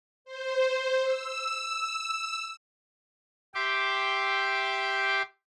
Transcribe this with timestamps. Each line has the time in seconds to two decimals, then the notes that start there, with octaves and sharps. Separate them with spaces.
0.25 C5
1.03 E6
3.55 G4 E5 G5 C6 D6